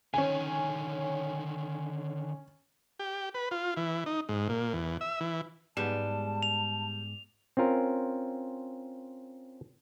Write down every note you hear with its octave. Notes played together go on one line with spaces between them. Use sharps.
D3 D#3 C#4 G#5
G4
B4
F4
E3
D#4
G#2
A#2
E2
E5
E3
G#2 G3 G#3 B3 A5 E7
F7
C4 C#4 F4 A#4